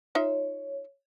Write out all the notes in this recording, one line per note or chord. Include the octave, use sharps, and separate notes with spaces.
D#4 F4 C#5 E5